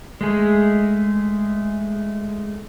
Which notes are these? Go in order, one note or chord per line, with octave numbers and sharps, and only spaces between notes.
G#3 A3 G#4